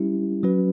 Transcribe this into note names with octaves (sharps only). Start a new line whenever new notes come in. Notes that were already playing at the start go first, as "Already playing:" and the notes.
Already playing: G3 C#4 E4 G4
F#3 C#4 F#4 B4